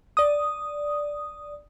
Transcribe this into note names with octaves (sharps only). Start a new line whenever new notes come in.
D5 D#6